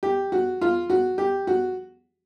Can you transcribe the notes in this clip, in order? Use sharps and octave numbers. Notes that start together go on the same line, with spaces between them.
G4
F#4
F4
F#4
G4
F#4